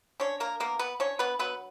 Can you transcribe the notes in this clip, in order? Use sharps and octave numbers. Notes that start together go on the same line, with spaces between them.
C#4 D4 C#5
A#3 A#4
A#3 B3 A#4
B3 B4
C#4 D4 C#5
B3 B4
F#3 B3 B4